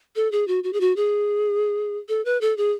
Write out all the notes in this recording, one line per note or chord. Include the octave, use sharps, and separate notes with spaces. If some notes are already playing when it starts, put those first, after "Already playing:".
A4
G#4
F#4
F#4
G#4
F#4
G#4
A4
B4
A4
G#4